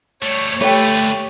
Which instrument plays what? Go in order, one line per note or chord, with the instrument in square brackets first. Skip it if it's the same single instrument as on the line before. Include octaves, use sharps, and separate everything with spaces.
[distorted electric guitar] G3 A3 [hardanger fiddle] C#5
[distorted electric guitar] D3 B4 [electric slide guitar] A3 [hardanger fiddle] G4 [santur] C#5 G5